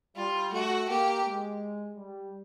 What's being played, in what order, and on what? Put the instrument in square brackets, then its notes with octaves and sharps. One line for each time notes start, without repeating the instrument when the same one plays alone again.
[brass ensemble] G3 [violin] F4
[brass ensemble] A3 [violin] F#4
[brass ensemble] A#3 [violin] G4
[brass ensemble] G#3
G3